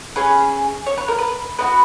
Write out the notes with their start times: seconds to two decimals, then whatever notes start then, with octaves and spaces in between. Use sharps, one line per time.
0.16 C#4 G#4 B4
0.86 C#5
0.98 B4
1.08 A#4
1.19 B4
1.58 B3 D#4 F#4 B4